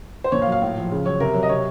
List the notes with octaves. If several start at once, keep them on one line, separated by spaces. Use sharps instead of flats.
C5
A#2 C#5
F5
F#3
F5
A2
F3
C#3
F#3 C#5
C3 A#4
F#3
D#5
C3 C#5